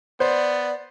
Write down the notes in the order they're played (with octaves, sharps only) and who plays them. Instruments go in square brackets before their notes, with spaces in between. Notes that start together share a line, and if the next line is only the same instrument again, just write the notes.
[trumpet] B3 [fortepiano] C5 [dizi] D5